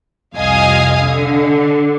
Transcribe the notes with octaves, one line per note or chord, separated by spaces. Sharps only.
C2 F2 D#5 F5 G#5 D#6
D3